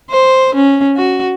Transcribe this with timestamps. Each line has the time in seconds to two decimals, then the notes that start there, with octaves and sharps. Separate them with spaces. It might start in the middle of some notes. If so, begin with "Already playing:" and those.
0.10 C5
0.55 C#4
0.96 F#4